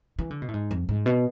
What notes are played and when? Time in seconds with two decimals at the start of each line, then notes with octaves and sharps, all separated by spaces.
0.19 E3
0.30 D3
0.42 B2
0.48 A2
0.54 G#2
0.71 F2
0.89 G#2
1.06 B2